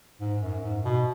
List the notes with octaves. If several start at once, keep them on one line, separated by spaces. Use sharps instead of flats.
G#2
F#2
G#2
B2